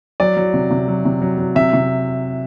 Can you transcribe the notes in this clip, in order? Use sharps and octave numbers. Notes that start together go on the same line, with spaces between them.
F#3 D5
F#3
C3
C3
F#3
C3
F#3
F#3
C3 E5
C3